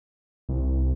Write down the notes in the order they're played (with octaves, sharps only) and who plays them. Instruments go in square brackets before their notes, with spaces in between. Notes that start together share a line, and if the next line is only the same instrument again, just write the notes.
[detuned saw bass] C2